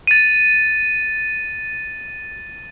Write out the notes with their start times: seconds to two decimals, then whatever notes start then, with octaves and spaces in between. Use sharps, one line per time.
0.07 A6 D#7